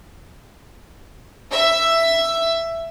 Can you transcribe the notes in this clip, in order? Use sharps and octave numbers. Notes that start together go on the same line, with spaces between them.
E5